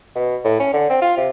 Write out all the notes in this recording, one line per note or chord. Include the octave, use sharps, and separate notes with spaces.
B2
A2
C#4
D3
C4
F4
C3